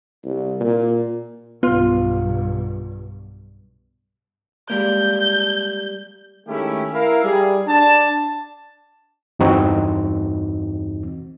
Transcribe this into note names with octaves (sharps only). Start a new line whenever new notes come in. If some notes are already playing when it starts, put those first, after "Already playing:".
C2
A#2
B1 G2 B3 F4
G3 G#3 A#3 G6
D#3 G#3 A3 C#4 E4 G4
E4 A#4 F5
G3 G#4
D4 A5
E2 G2 E3 C4 D#4 F#4